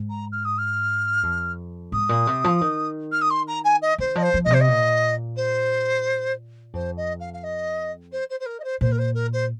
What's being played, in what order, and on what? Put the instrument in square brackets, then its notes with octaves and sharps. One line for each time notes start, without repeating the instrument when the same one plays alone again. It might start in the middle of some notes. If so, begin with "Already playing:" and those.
Already playing: [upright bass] G#2
[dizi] A#5
F6
D#6
F6
[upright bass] F2
[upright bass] G#2 [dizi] D#6
[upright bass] A#2
C3
F3
D#3
[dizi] F6
D#6
C6
A#5
G#5
D#5
[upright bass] D#3 [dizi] C5
[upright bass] F3 [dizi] D#5
[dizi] C5
[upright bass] F3
[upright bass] A#2 [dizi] D#5
[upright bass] C3 [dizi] C5
[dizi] D#5
[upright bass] A#2
[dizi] C5
[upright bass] F2 [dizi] C5
[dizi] D#5
F5
F5
D#5
C5
C5
C5
A#4
D#5
C5
[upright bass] A#2 [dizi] C5
[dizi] A#4
C5
A#4
C5